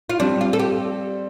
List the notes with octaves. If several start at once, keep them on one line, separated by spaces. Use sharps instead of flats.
F4
G3 C4 D4
F4
A4
G4